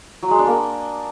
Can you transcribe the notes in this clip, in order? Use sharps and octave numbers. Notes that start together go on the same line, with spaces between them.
F#3
G#3
D4
A#3